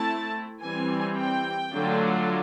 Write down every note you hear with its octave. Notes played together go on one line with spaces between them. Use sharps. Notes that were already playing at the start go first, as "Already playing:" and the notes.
Already playing: A3 C4 E4 A5
E3 G3 C4 G#5
G5
D3 F#3 A3 D4 F4